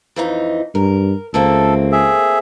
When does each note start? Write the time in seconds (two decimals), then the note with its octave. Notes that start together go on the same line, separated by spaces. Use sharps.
0.16 F2 E3 D#4
0.75 G2 A#4
1.34 C#2 A3 A#3 C4 A4
1.92 G#4 E5